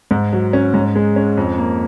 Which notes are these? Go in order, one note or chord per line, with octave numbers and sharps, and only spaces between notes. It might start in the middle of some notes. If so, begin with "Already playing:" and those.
G#2
F#3
C#4
G#2
G#3
C#4
F2
A#3